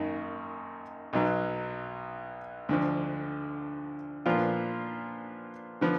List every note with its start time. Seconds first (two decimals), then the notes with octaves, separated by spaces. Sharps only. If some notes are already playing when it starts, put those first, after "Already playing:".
Already playing: G#1 F#2 D#3 A#3 D#4
1.13 B1 B2 F#3
2.69 D2 D3 F3
4.26 A#2 F3 B3 D4 F4
5.81 D3 F3 B3